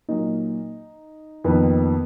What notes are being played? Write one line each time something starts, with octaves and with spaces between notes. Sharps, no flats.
A#2 F#3 A#3 D#4 D#5
F2 D#3 A#3 B3 B4